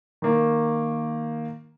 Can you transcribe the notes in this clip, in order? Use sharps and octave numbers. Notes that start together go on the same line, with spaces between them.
D#3 A#3